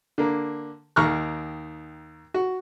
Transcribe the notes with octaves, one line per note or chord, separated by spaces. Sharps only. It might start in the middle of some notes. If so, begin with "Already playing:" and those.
D3 A#3
D#2 D#3 A#5 C#6 F6 F#6
F#4